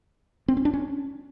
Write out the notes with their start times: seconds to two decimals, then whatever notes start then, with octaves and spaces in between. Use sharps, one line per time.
0.48 C4
0.57 C#4
0.65 D4
0.74 C#4